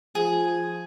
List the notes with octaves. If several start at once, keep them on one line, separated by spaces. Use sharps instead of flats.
F3 G#4